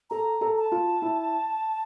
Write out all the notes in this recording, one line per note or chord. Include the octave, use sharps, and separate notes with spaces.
A4 A#5
A4
A#5
A5
F4
E4